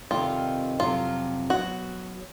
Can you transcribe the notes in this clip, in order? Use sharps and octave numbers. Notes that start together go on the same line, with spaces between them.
F2 C3 D#3 G3 C4 F4
F2 C3 D#3 F#3 F4
B2 F#3 B3 F#4